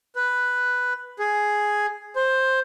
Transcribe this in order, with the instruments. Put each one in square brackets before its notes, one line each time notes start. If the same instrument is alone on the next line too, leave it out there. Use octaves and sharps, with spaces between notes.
[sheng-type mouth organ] B4
G#4
C5